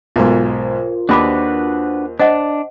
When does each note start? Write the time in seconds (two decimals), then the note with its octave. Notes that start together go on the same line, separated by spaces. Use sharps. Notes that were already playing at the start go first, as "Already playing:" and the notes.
0.16 B1 G#2 F4 A#4 C5
1.09 D#2 D4 F#4 G4 B4 B5 D6
2.20 D4 C5 D#5 F#5